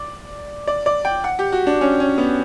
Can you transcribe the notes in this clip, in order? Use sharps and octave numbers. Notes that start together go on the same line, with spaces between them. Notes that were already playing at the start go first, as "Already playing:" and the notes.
Already playing: D5
D5
D5
G5
F#5
G4
F#4
D4
C#4
C#4
B3